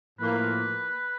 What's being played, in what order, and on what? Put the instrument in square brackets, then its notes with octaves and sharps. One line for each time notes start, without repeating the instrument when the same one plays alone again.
[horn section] A2 F3 A#3 [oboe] B4